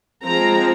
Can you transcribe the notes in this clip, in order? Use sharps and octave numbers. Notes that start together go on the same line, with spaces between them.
F3 G#3 C4 A#5